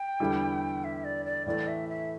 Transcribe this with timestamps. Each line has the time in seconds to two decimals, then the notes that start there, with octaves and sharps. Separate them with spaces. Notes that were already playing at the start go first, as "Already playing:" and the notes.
Already playing: G5
0.20 E2 D3 G3 E4
0.84 E5
1.04 D5
1.25 D5
1.46 A2 E3 A3 D5
1.67 E5
1.88 E5